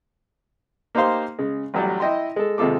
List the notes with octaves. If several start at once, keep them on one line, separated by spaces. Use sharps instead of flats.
A#3 D#4 G4 C5 F5 C6
C#3 G#3
A1 F#3 G3
E4 D#5 G5 C6
G#3 A4
D#2 C3 G#3 F4 A4 D6